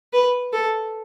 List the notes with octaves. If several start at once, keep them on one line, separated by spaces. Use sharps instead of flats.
B4
A4